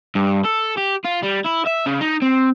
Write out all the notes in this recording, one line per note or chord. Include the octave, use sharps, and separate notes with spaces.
G2
A4
G4
F4
G3
E4
E5
C#3
D#4
C4